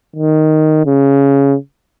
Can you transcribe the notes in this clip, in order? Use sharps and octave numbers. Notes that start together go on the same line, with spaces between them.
D#3
C#3